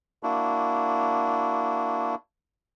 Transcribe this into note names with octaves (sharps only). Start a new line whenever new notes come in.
A#3 D4 E4 F#4